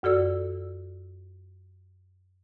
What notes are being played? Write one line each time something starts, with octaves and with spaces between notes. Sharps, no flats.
F#2 F#4 A4 D5 E6